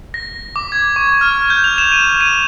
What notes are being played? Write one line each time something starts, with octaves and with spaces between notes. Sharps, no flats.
A#6
D6
G#6
C#6
F6
G6
F7
E7
D#7
D#7